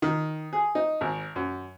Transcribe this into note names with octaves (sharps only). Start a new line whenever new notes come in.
D#3
G#4
D#4
G#1
F#2